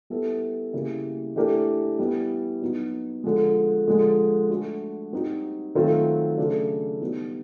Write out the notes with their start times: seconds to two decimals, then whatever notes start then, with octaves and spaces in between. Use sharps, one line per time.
0.10 G3 B3 E4 A4
0.73 C#3 E3 G3 A#3
1.36 E3 A3 D4 G4 A#4
1.99 E3 G3 B3
2.62 F#3 B3 D#4 F#4
3.24 D3 F3 G#3
3.88 D3 F3 G#3
4.50 A3 D4 F#4
5.13 G3 C4 D#4 F#4
5.75 D#3 F#3 A3 C4 F4
6.38 C#3 F#3 A3 D4
7.01 G3 B3 D#4